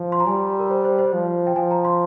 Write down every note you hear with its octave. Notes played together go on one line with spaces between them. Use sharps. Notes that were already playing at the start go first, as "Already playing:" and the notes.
Already playing: F3
C6
A#5
G3 G#5
A#4
C5
C5
C5
F3
G5
F3 G#5
A#5
C6